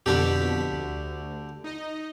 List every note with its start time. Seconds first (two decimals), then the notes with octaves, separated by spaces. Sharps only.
0.06 F2 B2 D3 D4 G4 B6
0.72 D2
1.64 D#4 D#5